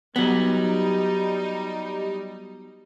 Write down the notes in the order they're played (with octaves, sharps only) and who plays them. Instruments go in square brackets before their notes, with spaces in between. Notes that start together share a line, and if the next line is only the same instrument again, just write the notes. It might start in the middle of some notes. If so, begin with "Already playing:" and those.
[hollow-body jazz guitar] F#3 B3 [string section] G3 D#4